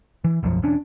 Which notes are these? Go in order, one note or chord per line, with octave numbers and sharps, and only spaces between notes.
E3
E1 B1 F#2 F3
E1 E2 C#4 D4